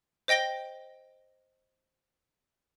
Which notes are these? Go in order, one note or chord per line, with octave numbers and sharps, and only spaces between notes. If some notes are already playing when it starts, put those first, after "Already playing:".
C5 D#5 G5 A#6 G7